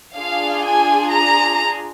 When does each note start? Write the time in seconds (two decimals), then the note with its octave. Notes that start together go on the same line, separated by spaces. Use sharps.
0.16 D4 F4 G#4 F5
0.65 G#5
1.12 A#5